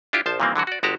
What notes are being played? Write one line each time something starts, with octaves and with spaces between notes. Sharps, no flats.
D4 E4 F4 G4
A#1 F3 C5 A5
A#2 D#3 E3 G3 A#3 C4
D3 E3 F#3 F#4
F#4 D5
G1 G#3 F#4 G4 A5 A#5